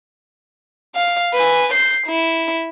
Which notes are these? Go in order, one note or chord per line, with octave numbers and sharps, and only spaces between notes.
F5
B4 G#5
G6 C7
E4